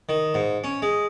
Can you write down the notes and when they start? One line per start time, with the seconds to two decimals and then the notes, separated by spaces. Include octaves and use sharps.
0.09 D#3
0.34 G#2
0.64 C#4
0.82 G#3